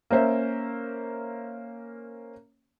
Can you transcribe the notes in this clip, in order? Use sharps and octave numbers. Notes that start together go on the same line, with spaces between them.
A#3 C#4 C5 E5